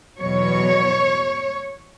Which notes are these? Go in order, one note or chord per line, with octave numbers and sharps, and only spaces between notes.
E2 B2 F#3 C#5